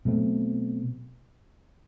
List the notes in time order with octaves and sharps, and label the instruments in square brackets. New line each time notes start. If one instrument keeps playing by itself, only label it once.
[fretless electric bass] B2 F#3 A3 C4